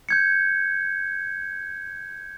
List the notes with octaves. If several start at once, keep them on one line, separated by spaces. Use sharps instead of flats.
G6 G#6 C#7